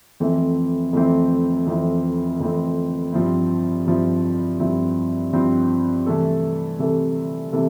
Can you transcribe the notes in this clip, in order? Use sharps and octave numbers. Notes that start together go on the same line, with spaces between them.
F2 E3 A3 C4 E4
F2 E3 A3 C4 E4
F2 E3 A3 C4 E4
F2 E3 A3 C4 E4
G2 F3 C4 E4
G2 F3 C4 E4
G2 F3 C4 E4
G2 F3 C4 E4
C3 E3 A3 E4 A4
C3 E3 A3 E4 A4
C3 E3 A3 E4 A4